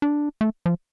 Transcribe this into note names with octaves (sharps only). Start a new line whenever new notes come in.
D4
A3
F3